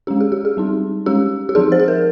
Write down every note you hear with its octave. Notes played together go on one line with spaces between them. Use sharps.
G#3 C#4 G4
G#4
G4
G#4
G3 C4 D#4
G#3 C#4 G4
G4
F3 C4 D#4 G#4
C5
G#4
A#4